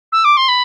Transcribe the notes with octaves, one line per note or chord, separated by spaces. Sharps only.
E6
D6
C6
B5